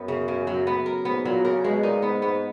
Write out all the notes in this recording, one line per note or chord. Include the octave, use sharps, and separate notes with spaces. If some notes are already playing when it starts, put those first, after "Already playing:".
Already playing: F#2 B3
C#3
C#3
F#3
B3
A#4
G#2 B3
A#2 F#3
B2
C#3 A#4
B2 G#3
A#2 D#4
G#2 B3
G#2 B3